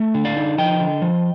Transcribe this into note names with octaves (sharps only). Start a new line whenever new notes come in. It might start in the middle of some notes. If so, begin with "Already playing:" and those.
Already playing: A3
D3
D5 F5
D#4
F3 D#5 G5
D3
F3